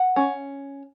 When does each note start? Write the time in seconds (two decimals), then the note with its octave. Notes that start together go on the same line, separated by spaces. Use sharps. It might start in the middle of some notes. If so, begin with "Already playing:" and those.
Already playing: F#5
0.16 C#4